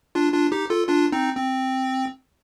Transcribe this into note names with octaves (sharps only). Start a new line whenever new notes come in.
D4 F4
D4 F4
D#4 G4
F4 A4
D4 F4
C4 D#4
C4